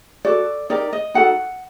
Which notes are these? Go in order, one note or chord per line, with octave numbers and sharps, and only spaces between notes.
F#4 A4 D5
D#4 G4 A#4 D5
D#5
D#4 F#4 A4 F#5